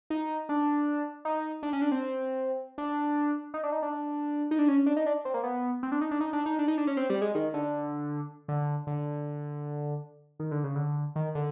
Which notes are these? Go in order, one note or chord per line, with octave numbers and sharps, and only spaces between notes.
D#4
D4
D#4
D4
C#4
D4
C4
D4
D#4
D4
D#4
D4
D#4
D4
C#4
D4
D#4
D4
C4
A#3
B3
C4
D4
D#4
D4
D#4
D4
D#4
D4
D#4
D4
C#4
C4
G3
G#3
D#3
D3
D3
D3
D#3
D3
C#3
D3
D#3
D3